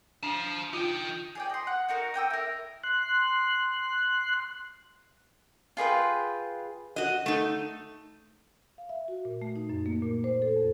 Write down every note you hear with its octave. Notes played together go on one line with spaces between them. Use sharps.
D4 F5 A5
D#4 F4 G5
G#4 D5 G5
D#5 C6
F#5
D#4 F#4 A#4
D#5 G5 D6 E6
E4 A#4
C6 F#6
F4 G#4 B4 G5
F#4 D#5
A3 D#4
F5
E5
F#4
A#2
A3
D#4
F#2
A#3
A#2
C5
A4
F2